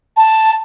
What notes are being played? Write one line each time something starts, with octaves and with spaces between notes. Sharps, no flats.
A5